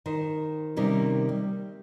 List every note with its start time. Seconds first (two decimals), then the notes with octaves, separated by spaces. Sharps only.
0.06 D#3 C5
0.76 C3 D#3 G3 A#3 C#4
1.29 G3